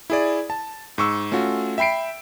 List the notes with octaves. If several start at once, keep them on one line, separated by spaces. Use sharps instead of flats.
E4 G#4 D5
A5
G#2 C#6 E6
A3 C#4 F4 F#4
E5 G5 B5 C7 D7